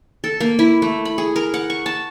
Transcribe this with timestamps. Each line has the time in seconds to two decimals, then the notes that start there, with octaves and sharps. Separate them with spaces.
0.24 A4
0.40 A#3
0.59 E4
0.82 A3
1.05 B5
1.18 G#4
1.36 A#4
1.54 F#5
1.70 C#6
1.86 A5